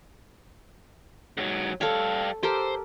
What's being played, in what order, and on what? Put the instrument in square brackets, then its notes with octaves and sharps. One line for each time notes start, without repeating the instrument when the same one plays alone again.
[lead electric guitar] G#2 F#3
[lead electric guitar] G3 F5 [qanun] A4 C#5
[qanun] G4 A4 A#4 [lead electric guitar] C5